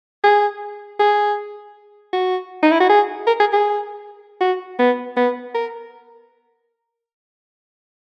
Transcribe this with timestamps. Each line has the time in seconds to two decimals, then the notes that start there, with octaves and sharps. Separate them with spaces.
0.24 G#4
0.99 G#4
2.13 F#4
2.63 D#4
2.72 E4
2.80 F#4
2.89 G#4
3.27 A#4
3.40 G#4
3.53 G#4
4.41 F#4
4.79 B3
5.17 B3
5.55 A#4